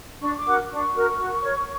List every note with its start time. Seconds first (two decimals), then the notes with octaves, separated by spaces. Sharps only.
0.21 D4 C#6
0.37 D6
0.45 F#4 A#4
0.70 D4 C#6
0.94 F#4 A#4
1.18 F#4
1.42 A#4 C#5